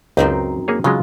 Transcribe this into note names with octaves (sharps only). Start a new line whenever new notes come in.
C#2 F#2 C4 D#4 G5
A#3 G#4 C#5
C#3 F#3 G#3 F4